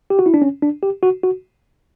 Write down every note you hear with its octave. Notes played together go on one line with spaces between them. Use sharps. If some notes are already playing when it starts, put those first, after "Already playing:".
G4
F#4
E4
D4
C#4
D4
G4
F#4
F#4